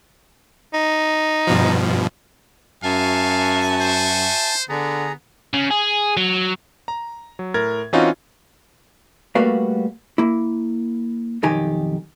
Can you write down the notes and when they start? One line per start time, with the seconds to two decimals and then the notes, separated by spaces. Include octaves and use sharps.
0.74 D#4
1.47 G2 B2 F3
2.84 F#2 F#4 E5 F5 G#5 A5
3.81 C5
4.69 D3 B3 G#4 A#5
5.54 C#3
5.71 G#4
6.17 F#3
6.88 A#5
7.39 F#3
7.54 A2 A#4 G#6 A6
7.93 E3 C4 C#4 D#4 F4 F#4
9.35 G3 A3 A#3 F#4 B4 F5
10.18 A#3 E4
11.43 B1 F2 D#3 D#4 G4 G#5